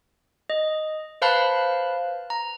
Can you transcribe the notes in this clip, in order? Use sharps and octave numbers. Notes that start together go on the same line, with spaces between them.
D#5
B4 C5 F5 A5 B5 F#6
A#5